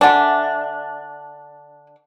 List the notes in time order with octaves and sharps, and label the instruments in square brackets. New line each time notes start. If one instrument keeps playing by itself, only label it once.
[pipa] D3 D4 [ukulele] E5 F#5 G#5